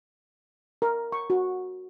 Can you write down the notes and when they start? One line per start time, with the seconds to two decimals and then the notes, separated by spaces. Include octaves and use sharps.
0.82 A#4
1.12 C#6
1.30 F#4